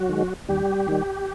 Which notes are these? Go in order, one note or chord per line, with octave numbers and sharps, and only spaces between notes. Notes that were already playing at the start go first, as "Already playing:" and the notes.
Already playing: F#3 F#4
D#3 G#3
D#2 G3 G4
D#3 G3